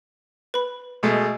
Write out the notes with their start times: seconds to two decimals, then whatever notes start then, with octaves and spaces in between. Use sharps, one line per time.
0.54 B4 B5
1.03 B2 G#3 A3